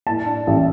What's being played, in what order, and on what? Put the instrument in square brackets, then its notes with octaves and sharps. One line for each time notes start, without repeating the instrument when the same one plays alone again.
[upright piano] A2 A5
D4
A1